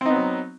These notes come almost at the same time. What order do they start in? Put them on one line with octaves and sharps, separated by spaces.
C4 D#4 B3 F#3